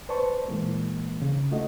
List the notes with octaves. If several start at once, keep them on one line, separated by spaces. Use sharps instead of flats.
B4 C5 D5 A5 C#6
A#2 E3 G#3 A#3
C#3
A3 D4 F4 F#4 D#5